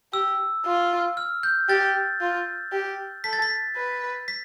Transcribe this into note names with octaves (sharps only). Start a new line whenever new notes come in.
G4 E6
F4
F6
G6
G4 A6
F4
G4
A4 B6
A6
B6
B4
B6